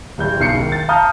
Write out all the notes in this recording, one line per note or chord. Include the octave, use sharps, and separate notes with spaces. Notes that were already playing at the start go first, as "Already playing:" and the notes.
D1 G3 G6
B1 C7 C#7
G#2 D#3
A6
F5 A5 A#5 D#6 F6 G6